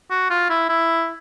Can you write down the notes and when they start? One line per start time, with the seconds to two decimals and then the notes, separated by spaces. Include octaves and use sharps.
0.11 F#4
0.30 F4
0.50 E4
0.69 E4